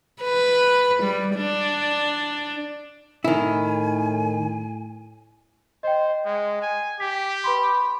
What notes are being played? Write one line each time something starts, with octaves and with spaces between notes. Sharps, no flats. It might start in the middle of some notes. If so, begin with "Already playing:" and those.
B4
G3
D4
A2 D#3 E4 G#5
C5 D#5 G5
G#3
G#5
G4 B6
B4 B5 C6